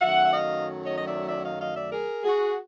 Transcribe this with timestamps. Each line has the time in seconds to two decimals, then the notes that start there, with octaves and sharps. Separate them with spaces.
0.01 F#2 D#3 F#3 A3 E5 F#5
0.25 E5
0.32 D#5 F5
0.85 C#5 D#5
0.97 D#5
1.07 D5 E5
1.28 D5 E5
1.44 D#5 F5
1.60 D#5 F5
1.76 D5 E5
1.92 G#4 A#4
2.24 F#4 G#4